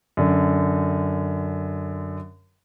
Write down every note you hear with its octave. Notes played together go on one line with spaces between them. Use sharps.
F#2 D3